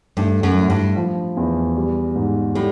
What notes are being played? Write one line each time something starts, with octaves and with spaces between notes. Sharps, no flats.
G2 A3
F#2
A2
G2
F3
E2
G3
G#2
A2 G3